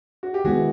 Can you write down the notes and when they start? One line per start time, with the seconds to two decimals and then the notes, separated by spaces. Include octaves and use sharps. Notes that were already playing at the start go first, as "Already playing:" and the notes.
0.23 F#4
0.34 G4
0.45 D#3 G#3 B3 E4 F#4 G#4